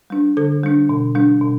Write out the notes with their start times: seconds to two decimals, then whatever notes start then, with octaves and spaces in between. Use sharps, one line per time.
0.10 G3 D4
0.37 D3 A4
0.63 G3 D4
0.89 B2
1.15 G3 D4
1.41 B2